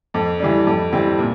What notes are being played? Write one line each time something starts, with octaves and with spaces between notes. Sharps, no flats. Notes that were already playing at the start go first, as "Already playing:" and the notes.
F2
E3 G3 D4
F2
E3 G3 C4
A#2